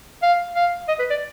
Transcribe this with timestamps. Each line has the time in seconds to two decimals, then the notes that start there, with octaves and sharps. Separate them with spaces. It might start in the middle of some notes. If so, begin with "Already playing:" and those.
0.22 F5
0.55 F5
0.88 D#5
0.99 B4
1.10 D5